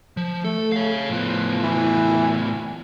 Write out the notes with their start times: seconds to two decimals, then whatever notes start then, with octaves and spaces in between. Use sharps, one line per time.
0.17 F3
0.44 A3 A4
0.72 C#5 F5
1.10 A2 F3 B3
1.63 E3